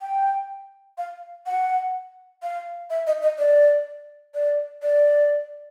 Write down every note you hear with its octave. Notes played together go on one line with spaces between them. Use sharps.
G5
F5
F#5
F5
E5
D#5
D#5
D5
D5
D5